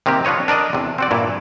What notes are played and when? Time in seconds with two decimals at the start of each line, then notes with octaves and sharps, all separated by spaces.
0.06 C3 D#3 A#3 C4 G4
0.25 D4 F4 B4 C#5 D#5
0.48 D4 A#4 D5 D#5
0.73 E2 C3
0.98 C4 F#4 D5
1.11 G2 A#2 E4